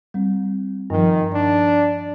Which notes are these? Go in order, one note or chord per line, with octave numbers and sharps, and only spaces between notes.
G3 C4
G2 D#3 F3
D4